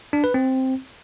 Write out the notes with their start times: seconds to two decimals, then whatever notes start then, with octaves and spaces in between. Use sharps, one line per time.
0.13 D4
0.24 B4
0.34 C4